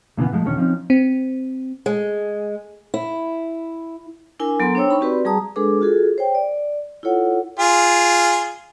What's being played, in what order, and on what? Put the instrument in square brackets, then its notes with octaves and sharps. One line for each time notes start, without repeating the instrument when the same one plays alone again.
[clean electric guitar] E2 A#2 C#3 E3 B3
G#2 F3 G#3 A3
B1 E2 D3 D#3 C#4 C#5
F3 C4 C#4 D#4
[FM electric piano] C4
[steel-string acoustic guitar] G#3
E4
[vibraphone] D4 E4 A#4 G#5
F#3 B3 A4 A#5 C6
D4 C5 C#5 G5 E6
D#4 B5 C#6
C4 F#4 G4 B4 D5 C6
G3 G#4 A5 A#5 D#6
G#3 D4 G#4 A4 B4 D6
F4 F#4 G#4 A4
C5 C#5 G5
D5
E4 F4 A4 C#5 F#5
[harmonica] F4 G#4